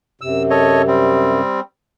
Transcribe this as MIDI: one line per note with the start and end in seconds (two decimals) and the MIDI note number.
0.21 1.41 42
0.21 1.41 48
0.21 0.43 88
0.50 0.82 69
0.50 0.82 73
0.50 0.82 75
0.87 1.60 55
0.87 1.60 60